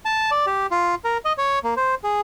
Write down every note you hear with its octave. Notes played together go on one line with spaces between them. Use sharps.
A5
D5
G4
F4
A#4
D#5
C#5
A#3
C5
G#4